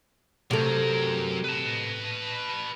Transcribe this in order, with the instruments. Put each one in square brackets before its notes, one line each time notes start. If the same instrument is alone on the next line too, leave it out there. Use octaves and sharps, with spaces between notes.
[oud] C3 A3 [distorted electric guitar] F#3 A#4
[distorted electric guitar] B4 A5